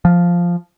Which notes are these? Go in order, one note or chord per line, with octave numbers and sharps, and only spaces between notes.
F3